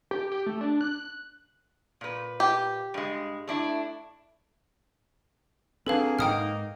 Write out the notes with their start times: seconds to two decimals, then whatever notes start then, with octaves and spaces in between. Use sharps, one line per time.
0.11 G4
0.32 G4
0.46 A3
0.61 D4
0.81 F#6
2.01 A#2 B4
2.40 G4
2.94 G2 G#3
3.47 A3 D4 E4
5.87 F#3 A#3 C4 D4 G#4 A4 B4 F5
6.19 G#2 A#3 D#4 G5 D#6 F6